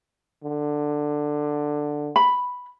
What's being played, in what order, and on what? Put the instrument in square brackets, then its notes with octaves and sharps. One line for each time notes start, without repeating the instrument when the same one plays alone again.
[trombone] D3
[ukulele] B5